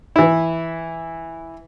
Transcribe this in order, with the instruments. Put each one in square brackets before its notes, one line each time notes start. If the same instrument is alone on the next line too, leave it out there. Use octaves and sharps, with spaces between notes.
[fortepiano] E3 E4